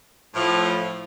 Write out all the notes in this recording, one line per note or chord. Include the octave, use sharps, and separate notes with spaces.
A2 F3